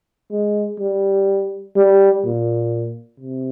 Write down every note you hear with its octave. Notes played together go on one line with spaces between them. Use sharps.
G#3
G3
G3
A#2
C3